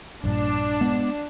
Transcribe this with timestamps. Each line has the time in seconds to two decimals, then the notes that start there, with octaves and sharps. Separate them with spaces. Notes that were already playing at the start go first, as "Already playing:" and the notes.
0.24 A#1 G2 A#2 D4
0.81 G#3 B3